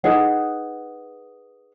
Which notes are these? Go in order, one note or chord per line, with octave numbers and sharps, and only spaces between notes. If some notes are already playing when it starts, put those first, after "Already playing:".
D#4 G#4 B4 F#5